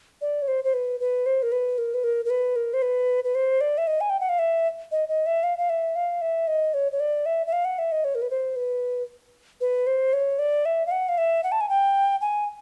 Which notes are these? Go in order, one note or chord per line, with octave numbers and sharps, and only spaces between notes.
D5
C#5
C5
C5
B4
B4
C5
A#4
B4
A#4
B4
A#4
A#4
B4
A#4
C5
B4
B4
C5
D5
E5
D#5
G#5
G5
F#5
F5
E5
D#5
D#5
E5
F5
F5
E5
F5
E5
D#5
C#5
C#5
D5
E5
E5
F5
F#5
E5
D#5
C#5
A#4
B4
C5
B4
B4
C5
C#5
D5
E5
F5
F#5
F5
E5
F#5
A5
G#5
G5
G#5